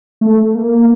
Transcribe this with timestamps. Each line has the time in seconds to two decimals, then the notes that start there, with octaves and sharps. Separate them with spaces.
0.21 A3
0.55 A#3